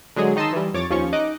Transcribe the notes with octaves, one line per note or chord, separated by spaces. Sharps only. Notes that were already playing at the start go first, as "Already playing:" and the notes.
D3 F#3 G#3 G#4
D#3 D#4 D#5 A5 C6 E6
E3 G3
F2 C#5 D6 A6
D#2 F3 C#4 C#6
D#4 D#5 D6 F#6